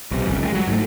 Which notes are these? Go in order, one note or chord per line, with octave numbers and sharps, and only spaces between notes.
B1 C3
G1 C#2 F#2
D3 G#3
F#3
G#2 A3